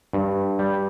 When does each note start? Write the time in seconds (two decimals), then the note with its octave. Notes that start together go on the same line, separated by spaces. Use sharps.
0.13 G2
0.59 G3